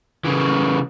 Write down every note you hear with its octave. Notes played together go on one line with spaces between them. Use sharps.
C#3 E3